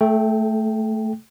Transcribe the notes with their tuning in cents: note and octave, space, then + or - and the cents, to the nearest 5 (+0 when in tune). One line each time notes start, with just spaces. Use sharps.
A3 +0 A4 -35 G5 +0